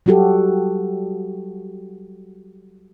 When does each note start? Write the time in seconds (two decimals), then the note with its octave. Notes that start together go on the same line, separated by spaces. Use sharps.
0.06 F#3 G3 F#4 G4 A4